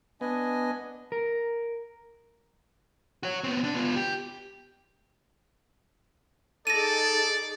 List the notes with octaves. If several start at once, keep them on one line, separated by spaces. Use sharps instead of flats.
B3 D4 D#5 G#5
A#4
F#4 C#5
B3 C4
D3 D4
B3 F4
G4
D#4 G#4 A4 D5 A#6 D#7